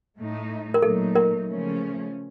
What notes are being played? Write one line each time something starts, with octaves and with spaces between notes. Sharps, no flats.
A2 A3 D#4
A#4
A#2 F#3 A3 D#4 A4
A#4
C#3 F3 A3 C#4